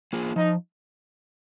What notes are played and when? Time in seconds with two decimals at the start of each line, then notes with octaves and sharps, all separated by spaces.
0.13 A#3 F4 G#4
0.36 F3 D#4